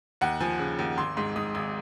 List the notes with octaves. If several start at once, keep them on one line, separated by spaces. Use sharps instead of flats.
D#2 F#5
F3 G#5
C#3
D#2
G#1 C6
G#2 C6
G#2 D#6
G#1 D#6